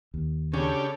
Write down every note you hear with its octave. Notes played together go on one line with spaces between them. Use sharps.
D#2
C#3 C#4 D4 G4 A4 C#5